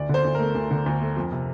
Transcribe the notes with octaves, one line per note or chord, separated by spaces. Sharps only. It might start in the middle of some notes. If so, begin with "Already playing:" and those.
Already playing: D2 D5
D3 C5
D2
A3 A#4
D2
D3
D2
A3
F2
C3